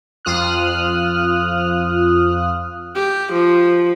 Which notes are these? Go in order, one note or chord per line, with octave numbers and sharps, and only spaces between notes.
F2 F3 F4 D#6 F6 F#6
G4
F3